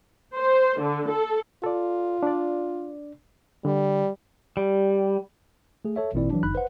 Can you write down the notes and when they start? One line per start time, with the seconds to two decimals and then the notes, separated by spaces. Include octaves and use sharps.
0.35 C5
0.80 D3
1.10 A4
1.64 F4 A4 D5
2.23 D4 D5
3.65 D3 G3
4.57 G3
5.85 A3 G#4
5.96 A4 C#5 E5
6.13 G#1 A#2 D#3 C4 E4 D5
6.30 E3 F#3 D4
6.43 G1 F#2 D#4 B5 F#6
6.55 B4 C5 F#5